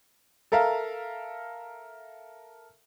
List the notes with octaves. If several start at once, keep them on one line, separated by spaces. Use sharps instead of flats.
A4 A#4 E5 F5